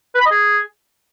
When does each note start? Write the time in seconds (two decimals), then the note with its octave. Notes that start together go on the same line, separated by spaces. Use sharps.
0.15 B4
0.20 B5
0.26 D#5
0.31 G#4